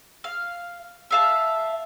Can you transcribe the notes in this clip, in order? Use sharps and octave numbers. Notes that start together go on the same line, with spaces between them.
F5
E5 F5 A5